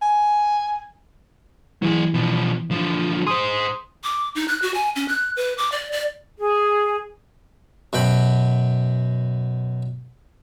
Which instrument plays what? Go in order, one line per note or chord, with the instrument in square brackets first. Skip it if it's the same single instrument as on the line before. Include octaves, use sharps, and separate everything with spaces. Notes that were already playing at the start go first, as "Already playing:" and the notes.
[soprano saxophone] G#5
[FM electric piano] E3 [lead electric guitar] F#3 G#4
[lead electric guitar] B2 F3
D3 F3
[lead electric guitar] G#4 C5 [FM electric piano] C6 D#6
[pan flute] D6
D#4
F#6
F#4
G#5
C#4
F#6
B4
D6
D5
D5
[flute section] G#4
[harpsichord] F#2 B2 G5 B5